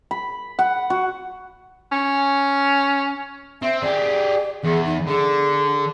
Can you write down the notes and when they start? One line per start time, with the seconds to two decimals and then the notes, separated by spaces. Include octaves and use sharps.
0.11 B5
0.59 F#5
0.90 F#4
1.92 C#4
3.62 C4 E5
3.82 G4 G#4 D5
4.64 E2 G#4
4.85 D#4
5.07 D3 G#4